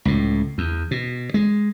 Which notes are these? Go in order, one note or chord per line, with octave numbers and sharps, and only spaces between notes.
C#2 A2
E2
B2
G#3